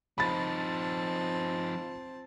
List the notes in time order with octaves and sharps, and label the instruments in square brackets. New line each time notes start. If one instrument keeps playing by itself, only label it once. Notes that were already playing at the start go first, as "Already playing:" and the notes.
[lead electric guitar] F3 D#4 [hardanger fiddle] C4 A5 [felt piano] B5 A6